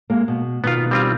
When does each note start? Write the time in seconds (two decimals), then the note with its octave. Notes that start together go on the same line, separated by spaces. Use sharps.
0.10 G#3 A#3
0.28 B2
0.64 B2 D#3 B3 F4
0.91 G3 C4 F4